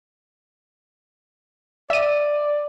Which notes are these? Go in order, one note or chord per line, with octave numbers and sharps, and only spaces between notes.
D5 E5 D#7